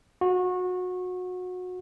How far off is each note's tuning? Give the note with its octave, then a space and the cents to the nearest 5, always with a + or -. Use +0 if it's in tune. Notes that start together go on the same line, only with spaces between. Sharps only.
F#4 -25